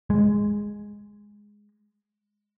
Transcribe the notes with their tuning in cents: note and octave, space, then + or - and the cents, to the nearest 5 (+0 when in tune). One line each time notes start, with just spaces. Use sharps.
G#3 -5